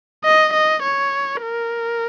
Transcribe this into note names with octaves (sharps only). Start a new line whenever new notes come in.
D#5
D#5
C#5
A#4